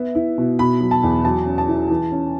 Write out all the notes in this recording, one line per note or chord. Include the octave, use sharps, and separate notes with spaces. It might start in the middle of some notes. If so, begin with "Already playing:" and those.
Already playing: B3 E5
E4
B2
B2 B5
F#3
A5
E2
F#3 A5
C#4
A5
E4
E3
C#4